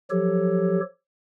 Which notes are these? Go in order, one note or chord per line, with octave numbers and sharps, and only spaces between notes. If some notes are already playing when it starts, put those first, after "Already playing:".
F3 F#3 G4 A4 C#5